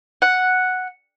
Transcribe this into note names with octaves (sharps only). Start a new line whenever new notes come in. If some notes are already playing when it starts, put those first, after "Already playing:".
F#5